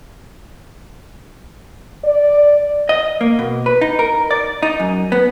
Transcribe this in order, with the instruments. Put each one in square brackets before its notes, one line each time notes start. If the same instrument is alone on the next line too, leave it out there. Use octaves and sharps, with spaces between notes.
[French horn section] D5
[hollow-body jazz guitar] D#5
A#3
B2
B4
D#4
A#4
D5
D#4
F#2
B3